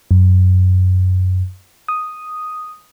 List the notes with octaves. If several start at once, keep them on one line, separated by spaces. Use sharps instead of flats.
F#2
D#6